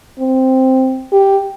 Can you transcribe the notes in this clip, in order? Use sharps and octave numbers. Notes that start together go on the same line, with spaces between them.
C4
G4